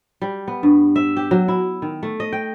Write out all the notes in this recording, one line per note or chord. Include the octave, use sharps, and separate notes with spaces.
G3
B3
G2
E5
G4
F#3
E4
D#3
A3
D#5
G5